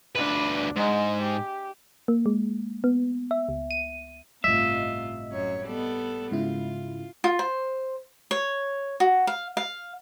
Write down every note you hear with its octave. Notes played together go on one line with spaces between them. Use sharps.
D2 D4 B4
G#2 G#3
G4
A#3
G#3
B3
E5
C#2
D#7
G1 A2 C3 F4 D#5 E5
F#2 C#5
G3 B3 A4
G#2 C#3 E4 F4
F4
C5
C#5
F#4
F5
F5